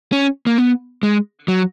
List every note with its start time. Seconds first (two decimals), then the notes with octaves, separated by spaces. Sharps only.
0.12 C#4
0.47 A#3
0.58 B3
1.03 G#3
1.48 F#3